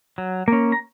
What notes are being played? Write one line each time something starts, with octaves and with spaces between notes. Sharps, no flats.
F#3
A#3 C#4
A#5